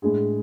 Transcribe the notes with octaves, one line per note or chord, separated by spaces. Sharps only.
A2 G#3 D4 G#4